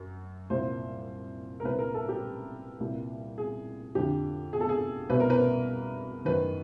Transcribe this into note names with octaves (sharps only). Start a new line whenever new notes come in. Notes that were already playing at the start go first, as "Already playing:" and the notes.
Already playing: F#2
C2 A#2 C5
A#4
C2 A#2 B4
A#4
A4
G4
C2 A#2
G#4
F2 D3 G4
G#4
A4
G#4
C2 B2 B4
A#4
B4
F#2 D#3 B4